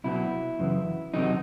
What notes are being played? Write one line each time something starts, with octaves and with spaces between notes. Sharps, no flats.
C2 B2 F#3 E4
F#2 C#3 E3
E2 C3 D#3 F#3 D#4